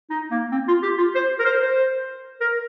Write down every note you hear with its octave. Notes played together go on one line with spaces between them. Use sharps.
D#4
A#3
C4
F4
G4
F4
C5
A#4
C5
C5
A#4